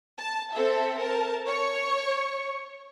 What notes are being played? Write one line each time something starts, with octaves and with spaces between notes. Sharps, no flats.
A5
C4 A4 E5
A#4 A5
C#5 C#6